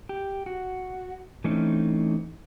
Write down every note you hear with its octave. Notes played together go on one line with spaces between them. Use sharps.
G4
F#4
E3 A3 C4 C#4 D#4